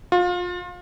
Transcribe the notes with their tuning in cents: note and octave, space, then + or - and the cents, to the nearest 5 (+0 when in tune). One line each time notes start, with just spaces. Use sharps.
F4 +30